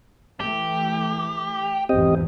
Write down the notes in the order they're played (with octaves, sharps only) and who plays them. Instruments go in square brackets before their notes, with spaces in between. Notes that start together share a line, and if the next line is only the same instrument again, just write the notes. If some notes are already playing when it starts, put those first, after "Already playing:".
[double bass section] E3 A3 [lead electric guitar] G4
[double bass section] G#1 E2 E3 [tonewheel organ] C4 G4 D#5